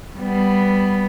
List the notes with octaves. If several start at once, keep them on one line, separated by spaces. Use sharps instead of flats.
G3 B3